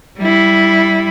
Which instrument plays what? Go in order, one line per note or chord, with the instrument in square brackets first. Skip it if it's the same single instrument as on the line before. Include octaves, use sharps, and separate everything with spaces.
[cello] G3 E4